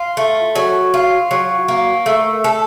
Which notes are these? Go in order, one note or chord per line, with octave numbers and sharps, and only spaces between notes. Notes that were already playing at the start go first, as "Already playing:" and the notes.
Already playing: F4
A3
F#3
F4
F#3
A#3
A3
A4